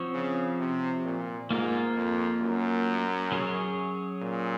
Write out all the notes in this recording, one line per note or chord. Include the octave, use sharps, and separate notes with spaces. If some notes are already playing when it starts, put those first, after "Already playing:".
Already playing: F3 C4 F#4 C#5
C#3
C3
A#2
G#2 A#3 F4 A#4
F2
F#2
F#3 C#4 G#4 C#5
A#2